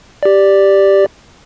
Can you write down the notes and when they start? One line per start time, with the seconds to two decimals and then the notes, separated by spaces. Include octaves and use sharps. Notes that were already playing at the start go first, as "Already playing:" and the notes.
0.23 G4 D5